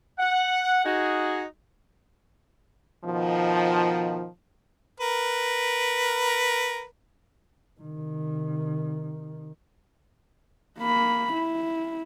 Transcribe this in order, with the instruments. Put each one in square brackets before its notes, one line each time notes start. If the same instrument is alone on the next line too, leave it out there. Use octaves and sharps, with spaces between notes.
[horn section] F#5
D#4 F#4 G#4
[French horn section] B2 D#3 F3
[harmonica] A#4 B4
[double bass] C3 D#3
[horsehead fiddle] A#3 B5
E4